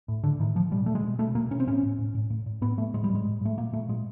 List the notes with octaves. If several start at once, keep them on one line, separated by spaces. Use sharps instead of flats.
A2
A2 D3
A2 D#3
A2 F3
B2 G3
B2 A3
G#3
B2
B2 A3
B2 A#3
B2 C#4
C4
A2 C#4
A2
A2
A2
A2
A2
A2 B3
A2 A3
A2 G#3
G3
A2 G#3
A2
A2 A3
A#2 A#3
A#2 A3
A#2 G#3